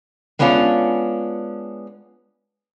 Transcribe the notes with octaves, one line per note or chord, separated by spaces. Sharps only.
G#3 B3 C#4 D4 F4